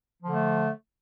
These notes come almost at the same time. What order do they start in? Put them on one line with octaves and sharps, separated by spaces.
F3 D3 A3